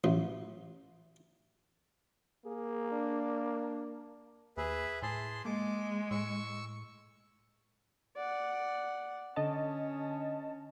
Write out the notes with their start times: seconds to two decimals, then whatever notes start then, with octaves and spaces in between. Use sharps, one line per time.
0.04 A1
2.46 A#3 G#4
2.92 D4
4.57 D#2 G#4 B4 E5
5.02 A2 G#4 A5 C6
5.45 G#3 A#3 D6
6.11 A2 C#6 E6
8.16 D5 F#5
9.36 D3 C#4 D#5 A5